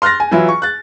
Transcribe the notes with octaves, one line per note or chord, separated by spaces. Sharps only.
C6 F6 F#6 A6 A#6
G#5
E3 F#3 E4 F4
C#6
F#6 A6